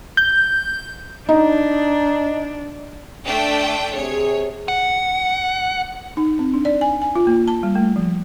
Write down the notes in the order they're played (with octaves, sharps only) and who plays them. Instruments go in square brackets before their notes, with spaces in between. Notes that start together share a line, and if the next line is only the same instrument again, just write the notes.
[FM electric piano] G6
[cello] D4 [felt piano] D#4
[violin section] A3 D4 G5
[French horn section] C3 G#4 [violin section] C#5
[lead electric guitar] F#5
[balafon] D#4
C4
D4
D5
G#5
G#5
F4
A#3
A5
G3
A3
F3